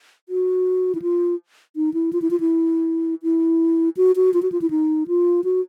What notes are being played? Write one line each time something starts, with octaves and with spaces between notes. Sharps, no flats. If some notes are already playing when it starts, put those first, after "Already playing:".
F#4
E4
F4
D#4
E4
F4
E4
F4
E4
E4
F#4
F#4
F4
F#4
F4
E4
D#4
F4
F#4